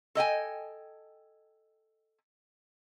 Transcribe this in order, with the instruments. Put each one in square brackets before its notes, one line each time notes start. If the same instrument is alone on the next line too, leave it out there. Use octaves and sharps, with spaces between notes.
[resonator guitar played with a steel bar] A4 D#5 G5 G#5